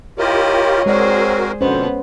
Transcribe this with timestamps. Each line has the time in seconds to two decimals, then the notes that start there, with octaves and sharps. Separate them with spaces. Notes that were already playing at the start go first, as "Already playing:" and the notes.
0.19 E4 F4 G4 A#4 C#5 D#5
0.86 G#3 C4 F#4 G#4 A#4 C5 D5
1.61 F2 B2 D3 B3 C#4 C5